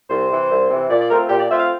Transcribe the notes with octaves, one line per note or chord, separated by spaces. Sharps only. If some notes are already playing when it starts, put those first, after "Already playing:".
C2 C5
C3 E3
C2
C3 E3
A#2 D5
D5
A3 C4 F4 A#4
A#2 G4
D5
A3 C4 F4 E5
F5